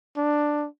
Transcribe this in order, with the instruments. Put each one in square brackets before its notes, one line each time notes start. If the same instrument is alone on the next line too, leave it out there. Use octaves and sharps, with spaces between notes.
[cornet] D4